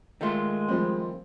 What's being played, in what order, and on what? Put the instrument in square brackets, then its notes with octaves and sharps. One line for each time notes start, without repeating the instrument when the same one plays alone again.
[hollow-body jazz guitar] D#3 A3 F4 [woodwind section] G#3
[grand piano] F3 G3 C4